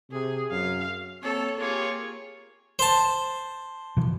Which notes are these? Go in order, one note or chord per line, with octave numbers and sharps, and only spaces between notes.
C3 G#4
F#2 F5
A#3 C4 A4 C#5
A#3 F4 G4 G#4 C#5
C5 A5
B2 E3 F3